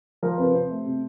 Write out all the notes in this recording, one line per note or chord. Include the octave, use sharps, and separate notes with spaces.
F3 A#4
C3 B4
C3 C5
A3
C3